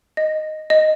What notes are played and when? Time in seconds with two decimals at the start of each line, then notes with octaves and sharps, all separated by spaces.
0.17 D#5
0.70 D#5